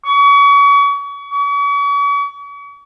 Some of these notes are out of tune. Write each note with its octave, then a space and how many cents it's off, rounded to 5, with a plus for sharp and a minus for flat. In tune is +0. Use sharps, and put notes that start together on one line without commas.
C#6 +35
C#6 +40